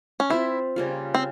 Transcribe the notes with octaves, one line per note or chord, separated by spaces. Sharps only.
C#4
C4 E4 F4 C5 E5
C#3 G3 A#3 F4
C4